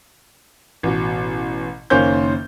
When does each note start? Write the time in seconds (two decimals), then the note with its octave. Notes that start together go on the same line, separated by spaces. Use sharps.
0.83 A1 B2
1.90 F#1 D#3 A#3 C#4 C5 G6